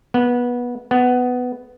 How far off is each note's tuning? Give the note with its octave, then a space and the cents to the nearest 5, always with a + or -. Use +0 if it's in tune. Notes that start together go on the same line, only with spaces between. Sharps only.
B3 -20
B3 +10